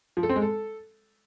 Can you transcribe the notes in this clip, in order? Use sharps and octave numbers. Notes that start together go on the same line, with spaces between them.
F3
A4
C4
G#3
A4